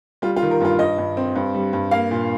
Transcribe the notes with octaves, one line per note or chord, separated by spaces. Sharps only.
G3 F4
F4
D#3
A#4
G2 F4
G2 D#5
G2
C4
G2
G3
G2
A#3 F5
A#2